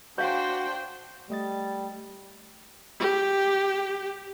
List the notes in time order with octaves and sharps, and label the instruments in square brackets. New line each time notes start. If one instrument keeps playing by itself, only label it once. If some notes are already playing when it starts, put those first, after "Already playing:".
[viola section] D4 C5 G5 [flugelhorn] F#4 [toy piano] C#5 F5
[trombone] G3 [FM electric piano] A3 D#5 A6
[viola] G4